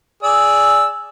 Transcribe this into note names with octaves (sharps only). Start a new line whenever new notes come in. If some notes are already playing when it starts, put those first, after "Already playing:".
G#4 D5 E6